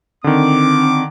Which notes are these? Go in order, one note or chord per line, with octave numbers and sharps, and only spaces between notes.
D3 D#3 C4 D6